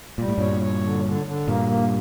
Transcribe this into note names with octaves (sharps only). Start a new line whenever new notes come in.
A#2 G3
A2
G2 A#2 C#5
C#5
D3
D3
D3
G2 A#2 A#3
A#3